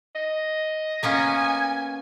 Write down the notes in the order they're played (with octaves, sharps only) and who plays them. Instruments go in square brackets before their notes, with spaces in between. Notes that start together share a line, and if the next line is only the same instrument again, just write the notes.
[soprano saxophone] D#5
[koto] A#3 B3 C#4 [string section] G#5